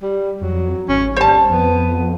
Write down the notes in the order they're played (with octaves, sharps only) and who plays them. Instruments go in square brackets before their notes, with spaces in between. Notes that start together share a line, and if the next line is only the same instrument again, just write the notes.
[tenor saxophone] G3
[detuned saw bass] F2 [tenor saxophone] F#3
[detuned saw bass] G#1 [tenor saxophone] C#4
[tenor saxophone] G3 [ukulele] C5 A5
[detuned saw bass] F2 [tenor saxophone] B3